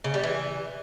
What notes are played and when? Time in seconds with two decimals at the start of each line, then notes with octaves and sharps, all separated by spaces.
0.04 C#3
0.14 G3
0.24 E3